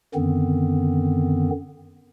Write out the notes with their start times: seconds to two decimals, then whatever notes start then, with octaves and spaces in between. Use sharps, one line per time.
0.14 F#2 D3 D#3 B3 C4